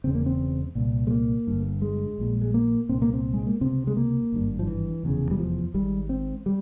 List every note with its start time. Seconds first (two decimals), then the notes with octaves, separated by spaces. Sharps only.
0.04 E1 E2 C#3 C4
0.15 A#3
0.26 C4
0.75 C2 A#2
1.07 G#3
1.11 A#3
1.47 G1 G2
1.82 G#3
2.18 A#1 A#2
2.41 G#3
2.54 A#3
2.89 C2 A#2 C4
3.02 A#3
3.14 C4
3.34 G#3
3.47 A#3
3.61 C#2 C3 C4
3.87 G#3
3.97 A#3
4.32 G#1 G2
4.59 F3
4.67 E3
5.03 F1 E2 C#3
5.31 G3
5.39 F3
5.74 G#1 G#2 G3
6.09 C4
6.46 G3